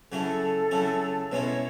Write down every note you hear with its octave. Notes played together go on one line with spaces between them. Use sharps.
C#3 F#3 C#4 E4 A4
C#3 F#3 C#4 E4
B2 G#3 C#4 E4 C#5